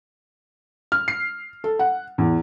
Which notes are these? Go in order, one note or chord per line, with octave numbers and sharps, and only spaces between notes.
F6
C7
A4
F#5
E2